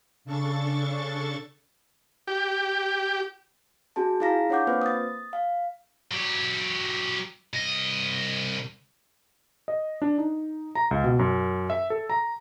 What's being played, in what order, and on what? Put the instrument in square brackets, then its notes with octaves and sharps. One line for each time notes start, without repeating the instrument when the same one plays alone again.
[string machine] C#3 D4 A4 C#6 A6
[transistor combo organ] G4
[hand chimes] C#4 F#4 G#4 A5
E4 F4 G#4 F5 A#5 A#6
D4 C#5 F5 F#5 D6 G6
A#3 C4 F4 B4 C5
D#6 A6
F5
[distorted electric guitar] F#3 G4
C2 D#5
[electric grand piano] D#5
D4
D#4
A#5
C#2
B2
F#2
E5
A4
A#5